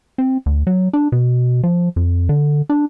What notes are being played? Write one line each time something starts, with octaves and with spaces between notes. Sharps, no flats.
C4
D2
F#3
D4
B2
F3
F2
D3
D4